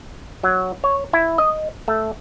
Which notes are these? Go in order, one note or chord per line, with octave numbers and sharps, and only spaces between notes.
F#3
C#5
E4
D#5
A3